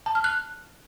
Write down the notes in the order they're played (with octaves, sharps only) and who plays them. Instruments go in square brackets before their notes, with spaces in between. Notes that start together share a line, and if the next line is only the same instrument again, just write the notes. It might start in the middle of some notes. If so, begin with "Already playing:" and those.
[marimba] A5
F6
F#6